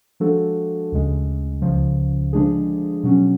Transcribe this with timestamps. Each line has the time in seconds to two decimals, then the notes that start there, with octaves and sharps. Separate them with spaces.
0.20 F3 G#3 D4 F#4 A4
0.92 D2 C#3 G#3
1.62 C#2 C#3 F3
2.33 D3 F3 G#3 D4 G#4
3.03 B2 F#3 C#4